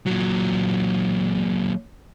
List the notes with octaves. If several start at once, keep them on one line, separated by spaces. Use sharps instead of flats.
A#2 F#3